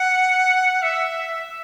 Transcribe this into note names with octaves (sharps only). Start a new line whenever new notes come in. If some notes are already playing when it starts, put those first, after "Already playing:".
Already playing: F#5
E5